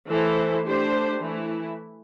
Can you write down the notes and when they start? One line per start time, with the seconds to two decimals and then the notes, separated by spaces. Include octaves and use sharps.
0.09 E3 A3 E4 A4 C5
0.65 A3 D4 G4 C5
1.19 E3 A3 E4